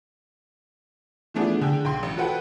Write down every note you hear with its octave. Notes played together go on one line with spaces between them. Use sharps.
E3 F3 A3 B3 D4 G#4
D3 G#4 G5
B1 G5 C6
A1
F#4 A4 B4 F#5 G5